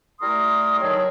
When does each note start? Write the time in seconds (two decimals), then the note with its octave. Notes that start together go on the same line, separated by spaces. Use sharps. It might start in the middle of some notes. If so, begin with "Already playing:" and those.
0.20 G3 A3 E4 A#4 C6 D#6
0.81 D#3 F#3 D#4 G#4 A4 C#5